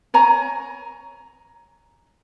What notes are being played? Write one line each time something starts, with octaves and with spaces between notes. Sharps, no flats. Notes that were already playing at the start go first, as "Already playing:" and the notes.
C#5 G#5 A#5